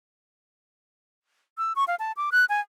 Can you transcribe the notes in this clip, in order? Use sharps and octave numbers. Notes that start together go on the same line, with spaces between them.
E6
C#6
F5
A5
D6
F#6
G#5